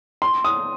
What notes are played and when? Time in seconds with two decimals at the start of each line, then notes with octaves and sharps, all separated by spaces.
0.22 C6
0.44 D#6